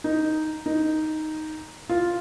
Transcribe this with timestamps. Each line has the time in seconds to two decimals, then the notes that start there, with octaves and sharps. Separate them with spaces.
0.04 D#4
0.66 D#4
1.90 F4